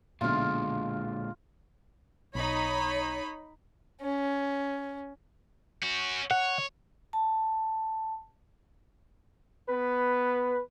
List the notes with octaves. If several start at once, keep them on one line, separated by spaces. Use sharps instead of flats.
B1 A#2 D3 G#3 F4 F5
B1 D#4 C#5 B5
C#4
C#4 F#4
C#5 F#5
A5
B3 B4